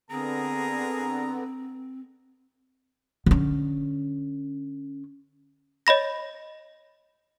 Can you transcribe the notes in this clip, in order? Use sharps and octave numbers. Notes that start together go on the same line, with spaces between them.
D3 B3 C4 G#4 A#4 A#5
D3 C#4
C#5 D#5 B5 A#6